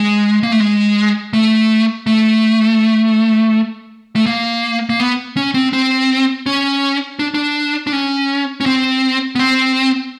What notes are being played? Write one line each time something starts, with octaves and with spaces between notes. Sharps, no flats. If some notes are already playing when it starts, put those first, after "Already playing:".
Already playing: G#3
A#3
A3
G#3
A3
A3
A3
A#3
A#3
B3
C#4
C4
C4
C#4
D4
D4
D4
C#4
C#4
C4
B3
C4